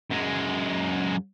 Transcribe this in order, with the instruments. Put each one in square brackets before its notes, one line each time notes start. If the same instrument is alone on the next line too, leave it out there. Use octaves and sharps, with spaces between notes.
[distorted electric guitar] F#2 G#3